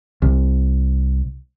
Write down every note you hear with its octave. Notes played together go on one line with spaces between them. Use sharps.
C2